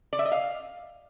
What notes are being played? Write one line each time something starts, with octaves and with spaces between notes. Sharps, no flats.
D5
E5
D#5
F5